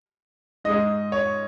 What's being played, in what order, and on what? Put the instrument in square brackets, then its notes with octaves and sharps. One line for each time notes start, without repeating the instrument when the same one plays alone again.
[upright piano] G#2 G#3 D#4 D#5
C#5